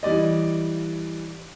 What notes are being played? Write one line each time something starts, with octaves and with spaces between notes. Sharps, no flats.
E3 G3 D5 D#5